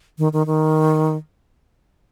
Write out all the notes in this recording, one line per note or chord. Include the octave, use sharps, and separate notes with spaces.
D#3
D#3
D#3